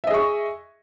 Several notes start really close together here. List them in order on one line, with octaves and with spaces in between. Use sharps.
E5 D#5 G#4 C#6